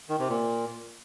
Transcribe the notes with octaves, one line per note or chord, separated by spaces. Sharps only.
D#3
C3
A#2